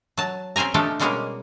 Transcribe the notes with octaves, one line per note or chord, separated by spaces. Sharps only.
F#3 A5
C4 C#4 C5 G#5 A#5
F3 A3 D4 D#4 G4 A4
B2 G3 G#3 A#3 C#4 A#4